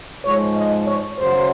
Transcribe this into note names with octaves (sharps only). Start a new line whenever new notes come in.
G#2 F3 G#3 C#5
D#5
C#5
F#2 C#3 F#3 C5